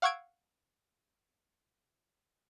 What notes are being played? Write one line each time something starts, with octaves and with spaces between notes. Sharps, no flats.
F5 F#5 C#6 E6 G#6 D7